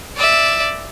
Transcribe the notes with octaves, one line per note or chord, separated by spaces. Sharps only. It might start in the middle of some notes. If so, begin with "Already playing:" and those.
D5 E5